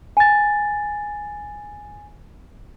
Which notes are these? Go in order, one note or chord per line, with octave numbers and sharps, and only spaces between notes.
G#5 A6